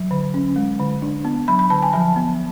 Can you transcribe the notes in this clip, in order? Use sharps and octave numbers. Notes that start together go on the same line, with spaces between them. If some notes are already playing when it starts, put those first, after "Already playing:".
Already playing: F#3
D3
C#4
G#3
D3
D4
B3
F#3 B5
B5
D3 A5
G#5
F3 A5
B3